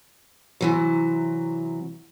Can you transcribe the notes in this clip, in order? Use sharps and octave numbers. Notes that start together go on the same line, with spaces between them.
C3 E3 F#3